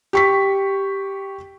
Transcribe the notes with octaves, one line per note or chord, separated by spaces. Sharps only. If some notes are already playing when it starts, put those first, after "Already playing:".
G4 C#6 B6